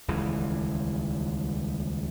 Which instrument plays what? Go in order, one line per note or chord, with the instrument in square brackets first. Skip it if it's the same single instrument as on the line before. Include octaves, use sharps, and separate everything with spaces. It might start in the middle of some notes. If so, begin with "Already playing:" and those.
[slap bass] D#1 C#2 E3